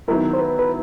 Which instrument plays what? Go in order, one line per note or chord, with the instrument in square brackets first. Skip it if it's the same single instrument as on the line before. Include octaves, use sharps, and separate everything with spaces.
[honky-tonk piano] D#3 F#3 B3 E4 [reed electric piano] A#4
[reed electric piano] C5
B4
B4